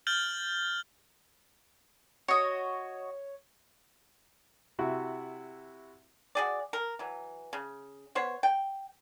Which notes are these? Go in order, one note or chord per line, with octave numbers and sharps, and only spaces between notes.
F6 G6 A6 F#7
F#4 C#5 D#5
C3 E4 F#4
F#4 G#4 D5
A#4
E3 F#3
C#3
B3 C5 C#5
G5